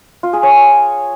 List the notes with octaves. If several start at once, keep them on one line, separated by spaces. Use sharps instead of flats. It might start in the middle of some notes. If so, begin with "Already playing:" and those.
F4
G#4
C#5